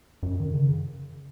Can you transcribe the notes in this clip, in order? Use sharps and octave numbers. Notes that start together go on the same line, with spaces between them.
F#2
D#3
C#3